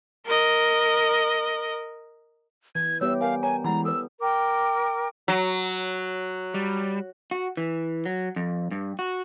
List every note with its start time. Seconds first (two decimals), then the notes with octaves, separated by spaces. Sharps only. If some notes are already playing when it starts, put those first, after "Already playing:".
0.25 A#4 D#5
2.75 E3 G#6
3.01 G3 B3 G4 C#5 E5 E6
3.21 A#4 F5 G#5
3.43 C#5 G#5 A#5
3.64 E3 G#3 E4 F#5 A#5 B5
3.85 A4 B4 E6
4.20 A#4 G5 D6
5.28 F#3
6.54 G3
7.31 F#4
7.57 E3
8.05 F#3
8.36 F2
8.71 G2
8.99 F#4